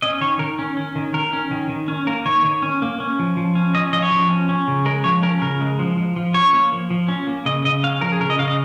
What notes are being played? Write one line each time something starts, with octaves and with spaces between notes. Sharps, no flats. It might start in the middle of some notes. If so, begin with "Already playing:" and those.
C#4 D#5
D#3 C#5
D#3 A#4
C#4
C#4
D#3
D#3 A#4
C#4
D#3
D#3
C#4
A#3 A#4
D#3 C#5
D#3
C#4
A#3
C#4
F3
F3
C#4
C#4 D#5
F3 D#5
C#5
F3
C#4
C#4
C#3
G#3 A#4
F3 C#5
C#4 A#4
C#3 A#4
G#3
F3
F3
F3
C#4 C#5
A#3
F3
F3
C#4
A#3
C#3 D#5
C#3 D#5
C#4 F5
F3 A#4
G#4
C#3 A#4
D#5
C#3 F5
D#5